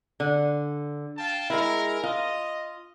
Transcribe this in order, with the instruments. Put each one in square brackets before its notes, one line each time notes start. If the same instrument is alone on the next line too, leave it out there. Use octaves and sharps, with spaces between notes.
[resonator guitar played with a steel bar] D3
[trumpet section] F5 G5 A5
[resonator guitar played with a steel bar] G#3 E4 [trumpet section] A#4
[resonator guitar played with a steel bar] F4 [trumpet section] D#5